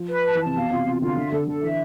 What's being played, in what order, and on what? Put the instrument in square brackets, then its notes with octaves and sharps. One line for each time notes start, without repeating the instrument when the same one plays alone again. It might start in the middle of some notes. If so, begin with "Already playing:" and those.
Already playing: [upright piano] F3
[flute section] B4
A5
[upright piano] E3
[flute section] A5
[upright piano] C3
[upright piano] B2 [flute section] F5
[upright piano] C3 [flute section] F4
[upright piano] C3 [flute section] F4
[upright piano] D3 [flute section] F4
[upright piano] D3 [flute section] E5
[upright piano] D3 [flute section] A4
[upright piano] D3 [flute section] A4
[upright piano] E3 [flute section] E5